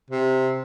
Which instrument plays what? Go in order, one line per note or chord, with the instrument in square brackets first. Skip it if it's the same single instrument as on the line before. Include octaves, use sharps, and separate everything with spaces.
[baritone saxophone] C3